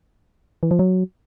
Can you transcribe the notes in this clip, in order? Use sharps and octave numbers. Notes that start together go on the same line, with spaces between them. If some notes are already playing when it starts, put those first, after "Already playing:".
E3
F3
F#3